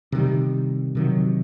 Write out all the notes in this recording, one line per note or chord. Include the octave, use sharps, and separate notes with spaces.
C3 D#3 G3
C3 D#3 F#3